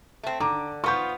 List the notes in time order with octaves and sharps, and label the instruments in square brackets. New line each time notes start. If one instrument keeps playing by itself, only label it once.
[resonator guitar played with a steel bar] A3 C4
[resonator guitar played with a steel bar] D3 [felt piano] A#5 D6
[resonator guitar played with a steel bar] F3 B3 F4 [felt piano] C#6 G6